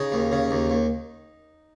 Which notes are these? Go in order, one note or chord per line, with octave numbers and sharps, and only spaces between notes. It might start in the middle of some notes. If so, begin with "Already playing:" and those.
Already playing: C#3 D#4
D#2
C#3
D#2
D#2